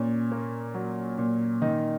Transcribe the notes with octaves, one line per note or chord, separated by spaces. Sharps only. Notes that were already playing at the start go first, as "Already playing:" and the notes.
Already playing: A#2 C#4
A#3
F#3
A#2
D#3 D#4